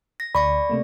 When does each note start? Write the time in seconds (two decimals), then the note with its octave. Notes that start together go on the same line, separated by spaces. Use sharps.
0.20 A#6
0.35 D2 D5 B5 C#6 A#6
0.69 C3 A3 A#3